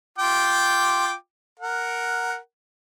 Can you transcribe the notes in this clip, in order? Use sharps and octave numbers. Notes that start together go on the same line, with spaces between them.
F4 G5 D6
A#4 F#5